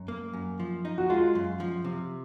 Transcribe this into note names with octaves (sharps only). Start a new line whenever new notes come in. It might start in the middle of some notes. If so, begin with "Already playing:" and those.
Already playing: F#2
A#3
F#2
F3
D#4
F#4
G#3 F4
F#2
F3
C3